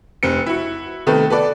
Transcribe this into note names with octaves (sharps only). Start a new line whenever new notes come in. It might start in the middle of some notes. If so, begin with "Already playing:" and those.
F1 C4 C#7
E4 F#4
C3 D#3 A3 B3
B3 A4 D5